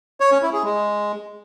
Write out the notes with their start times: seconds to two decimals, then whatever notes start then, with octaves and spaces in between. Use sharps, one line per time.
0.20 C#5
0.31 C#4
0.42 E4
0.53 G#4
0.64 G#3